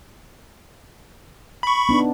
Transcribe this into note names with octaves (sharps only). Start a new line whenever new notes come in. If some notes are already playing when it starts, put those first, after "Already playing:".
B5 C#6
B3 D4 D#4